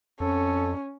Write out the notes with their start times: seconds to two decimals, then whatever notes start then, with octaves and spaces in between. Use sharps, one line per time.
0.20 F2 C#4 A4